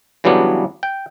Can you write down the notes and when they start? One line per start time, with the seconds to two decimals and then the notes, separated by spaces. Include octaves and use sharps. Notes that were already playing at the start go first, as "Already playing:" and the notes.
0.24 C#3 E3 F#3 G3 B3 D4
0.83 G5